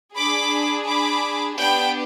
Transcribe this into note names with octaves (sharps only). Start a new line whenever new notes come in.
D4 G#4 B5 D6
B5 D6
B3 D4 G4 G5 B5